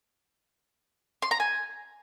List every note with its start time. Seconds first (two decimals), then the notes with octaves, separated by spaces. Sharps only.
1.22 C6
1.31 A#5
1.40 G#5